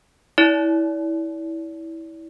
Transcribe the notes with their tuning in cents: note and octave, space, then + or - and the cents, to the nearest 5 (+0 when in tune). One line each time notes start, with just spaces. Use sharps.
E4 -20 D5 -40